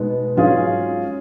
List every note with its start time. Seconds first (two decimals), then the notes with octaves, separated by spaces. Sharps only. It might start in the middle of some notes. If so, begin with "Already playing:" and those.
Already playing: B2 G#3 B3 D#4
0.36 G#2 F#3 C#4 F4 G#4